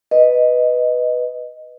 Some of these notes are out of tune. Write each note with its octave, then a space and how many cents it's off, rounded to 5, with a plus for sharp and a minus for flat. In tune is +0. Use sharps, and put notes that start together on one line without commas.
B4 +0 D#5 +0